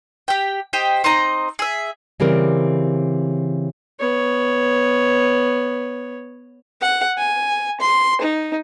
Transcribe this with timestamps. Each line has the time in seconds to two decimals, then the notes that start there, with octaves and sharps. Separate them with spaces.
0.28 G4 G5
0.73 G4 C5 D#5 G5
1.04 C4 D#4 D#5 A#5
1.59 G#4 E5
2.20 C#3 E3 G3 C4 A#4
4.00 B3 C#5
6.82 F#5
7.18 G#5
7.81 C6
8.21 D#4